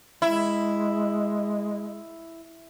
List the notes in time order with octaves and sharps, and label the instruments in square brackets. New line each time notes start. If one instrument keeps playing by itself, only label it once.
[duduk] G#3 [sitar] E4